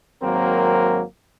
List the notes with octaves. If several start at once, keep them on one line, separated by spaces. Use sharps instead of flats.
G#1 F#3 A#3 C4 A#4